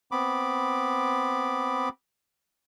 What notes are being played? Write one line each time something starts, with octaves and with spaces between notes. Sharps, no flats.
B3 C4 B5 D6